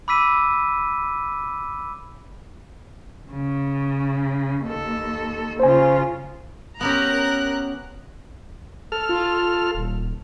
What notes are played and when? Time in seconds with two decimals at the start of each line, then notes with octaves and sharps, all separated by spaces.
0.08 B5 D6 E6 B6 D#7
3.31 C#3
4.63 D#2 A4
5.60 C#3 F4 C5 G#5
6.81 B3 C#4 G4 A#4 A#5 F#6
8.92 A4 F6
9.09 F4
9.75 D#1